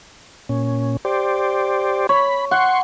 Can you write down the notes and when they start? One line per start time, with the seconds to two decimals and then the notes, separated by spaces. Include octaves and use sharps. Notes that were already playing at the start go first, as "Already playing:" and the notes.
0.49 A#2 C#4
1.05 G4 C5 D5
2.09 C#5 B5
2.51 F#5 C6 C#6